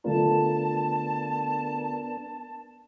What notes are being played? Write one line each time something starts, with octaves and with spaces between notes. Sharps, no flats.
D3 A3 B3 D4 F4 A#4 A5